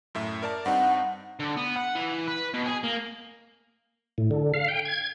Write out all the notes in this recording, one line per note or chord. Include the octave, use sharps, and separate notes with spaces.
F#2 A2 E5
A#4 D5 A5
G2 C4 D#4 F#5
D3
B3
F#5
E3
B4
B2
G#4
A#3
A2
D3
F5
G5
G#6